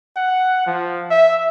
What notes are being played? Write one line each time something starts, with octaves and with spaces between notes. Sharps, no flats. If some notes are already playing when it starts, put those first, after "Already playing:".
F#5
F3
E5